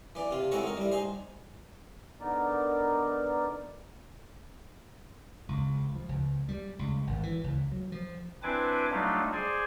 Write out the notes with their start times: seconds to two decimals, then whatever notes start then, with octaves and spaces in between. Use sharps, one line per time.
0.15 E3 D5
0.31 C3 F4
0.51 G#3 C4 E4 F#4 A4 C#5
0.64 D#4 A#4
0.77 G3 E4
0.92 D#4 G#4 C5
2.21 D3 B3 D#4 A#4 D5
5.49 C#2
5.95 F3
6.09 C#2
6.49 G3
6.79 C#2
7.07 G#1
7.23 E3
7.44 C#2
7.72 F#3
7.92 F3
8.43 C4 D4 E4 B4 G#5 D6
8.91 F#3 G3 A3 D4 D#4 F4
9.32 G#4 C5 D5 G#5